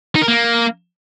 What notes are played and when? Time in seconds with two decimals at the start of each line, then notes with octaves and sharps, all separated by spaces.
0.15 D#4
0.22 A#4
0.28 A#3